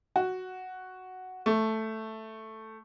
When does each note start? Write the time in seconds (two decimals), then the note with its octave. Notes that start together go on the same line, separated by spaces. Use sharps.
0.16 F#4
1.46 A3